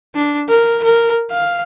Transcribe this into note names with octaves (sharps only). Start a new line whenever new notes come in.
D4
A#4
A#4
F5